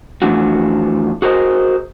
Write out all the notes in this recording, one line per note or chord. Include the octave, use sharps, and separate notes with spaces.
F2 E3 A3 D4 F4 F#4
F#4 G#4 A#4 C5 D#5